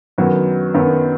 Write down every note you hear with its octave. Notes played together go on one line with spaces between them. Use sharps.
F#2 D#3 F#3 B3
F#2 D#3 F#3 B3